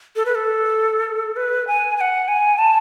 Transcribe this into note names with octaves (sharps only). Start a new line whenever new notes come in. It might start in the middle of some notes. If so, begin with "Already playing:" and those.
A4
B4
A4
B4
G#5
G#5
F#5
G#5
A5